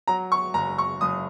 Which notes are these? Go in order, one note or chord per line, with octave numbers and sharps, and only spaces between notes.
F#3 A#5
C#6
F#1 A#5
C#6
F#1 D#6